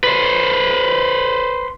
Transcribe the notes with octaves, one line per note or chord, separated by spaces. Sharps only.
B4 C5